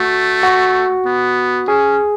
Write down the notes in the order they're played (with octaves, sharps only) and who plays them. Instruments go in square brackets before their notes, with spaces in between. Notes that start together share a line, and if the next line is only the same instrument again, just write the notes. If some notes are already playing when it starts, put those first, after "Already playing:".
Already playing: [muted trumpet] A3 [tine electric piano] F#4
[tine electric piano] F#4
[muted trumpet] B3
[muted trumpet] C#4 [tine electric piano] G#4